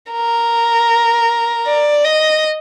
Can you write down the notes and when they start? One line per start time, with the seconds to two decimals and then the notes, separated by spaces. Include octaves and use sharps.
0.11 A#4
1.66 D5
2.05 D#5